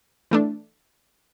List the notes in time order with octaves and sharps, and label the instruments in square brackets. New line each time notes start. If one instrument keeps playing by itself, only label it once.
[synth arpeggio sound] E3 A3 D4